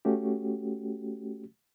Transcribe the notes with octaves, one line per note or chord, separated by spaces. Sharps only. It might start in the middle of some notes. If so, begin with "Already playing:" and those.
A3 C#4 F#4 G4